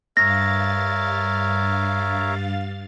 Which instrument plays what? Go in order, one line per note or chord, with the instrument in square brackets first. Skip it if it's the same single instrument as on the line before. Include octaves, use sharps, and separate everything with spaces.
[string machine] G2 F5 A6 [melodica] A#4 C#5 E5 [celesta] A#6